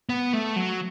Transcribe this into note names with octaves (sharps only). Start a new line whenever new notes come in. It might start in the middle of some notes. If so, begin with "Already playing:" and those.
B3
A3
F#3